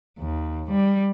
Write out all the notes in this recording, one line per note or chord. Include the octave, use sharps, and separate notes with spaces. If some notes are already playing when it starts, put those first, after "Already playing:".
D#2
G3